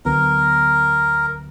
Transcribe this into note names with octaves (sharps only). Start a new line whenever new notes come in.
D2 D3 F#3 B3 A#4